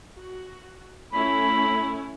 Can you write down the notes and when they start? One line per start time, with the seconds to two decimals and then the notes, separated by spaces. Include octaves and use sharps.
0.17 F#4
1.13 A3 C#4 E4 B5